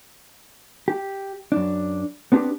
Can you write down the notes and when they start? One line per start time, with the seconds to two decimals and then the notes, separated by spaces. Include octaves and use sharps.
0.88 G4
1.52 F#2 D4
2.32 B3 C4 D4 F4 G4